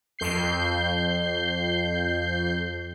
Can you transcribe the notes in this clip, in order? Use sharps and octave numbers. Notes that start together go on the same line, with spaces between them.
F2 G6 C7